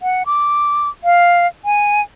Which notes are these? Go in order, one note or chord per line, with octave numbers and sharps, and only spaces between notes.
F#5
D6
F5
G#5